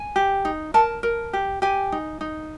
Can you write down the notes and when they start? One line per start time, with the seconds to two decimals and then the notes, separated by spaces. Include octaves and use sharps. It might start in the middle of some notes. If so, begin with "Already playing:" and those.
Already playing: G#5
0.16 G4
0.45 D#4
0.74 A#4 A5
1.03 A#4
1.33 G4
1.62 G4 G#5
1.92 D#4
2.21 D#4